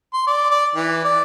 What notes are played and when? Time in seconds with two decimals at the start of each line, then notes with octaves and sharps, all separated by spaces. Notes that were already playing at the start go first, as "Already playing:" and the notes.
0.13 C6
0.27 D5
0.51 D5
0.76 E3
1.04 D5